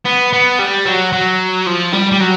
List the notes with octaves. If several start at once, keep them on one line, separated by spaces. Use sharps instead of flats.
B3
B3
G3
F#3
F#3
F3
G3
G3
F#3